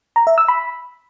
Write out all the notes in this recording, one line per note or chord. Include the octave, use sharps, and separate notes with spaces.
A#5
E5
E6
B5